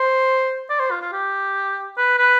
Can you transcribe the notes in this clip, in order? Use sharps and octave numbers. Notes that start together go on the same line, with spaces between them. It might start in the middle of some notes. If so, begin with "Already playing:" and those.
Already playing: C5
D5
C5
F4
F4
G4
B4
B4